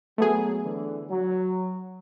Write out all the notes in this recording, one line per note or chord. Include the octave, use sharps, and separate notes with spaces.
F#3 A3 B3 G#4
D3 E3
F#3